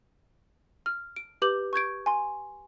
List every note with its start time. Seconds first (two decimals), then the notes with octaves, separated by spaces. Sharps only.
0.86 F6
1.16 D7
1.42 G4 B4 D6 G6 F#7
1.73 C#6 G6 G#6 D7
2.06 G#5 C6